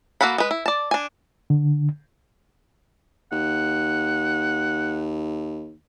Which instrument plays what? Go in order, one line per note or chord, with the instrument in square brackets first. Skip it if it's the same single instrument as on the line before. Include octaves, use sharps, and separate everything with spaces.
[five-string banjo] A#3 F#4 A4 F#5 B5
G#3 B4
E4
D5 A5
D4 G#5
[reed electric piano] D3
[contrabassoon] D#2 [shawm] F#5